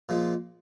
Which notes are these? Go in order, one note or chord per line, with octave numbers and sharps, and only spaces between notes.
A#2 F3 G#3